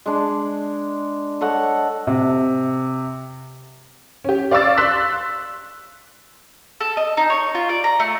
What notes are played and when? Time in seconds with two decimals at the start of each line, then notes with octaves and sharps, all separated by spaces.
0.06 G#3 D4
1.41 A4 C#5 D#5 F#5
2.07 C3
4.24 C#4 G4
4.51 D5 F5 C#6 D6 E6 A6
4.77 C6 E6 F#6 B6
6.81 A4
6.97 D#5
7.17 D#4
7.30 C#5
7.55 F4
7.69 D5
7.84 A#5
8.00 A3